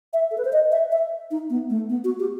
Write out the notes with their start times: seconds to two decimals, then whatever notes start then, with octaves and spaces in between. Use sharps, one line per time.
0.13 E5
0.31 A4
0.38 B4
0.45 C5
0.53 D#5
0.72 E5
0.92 E5
1.31 D#4
1.50 B3
1.70 A3
1.89 B3
2.04 F#4
2.19 G4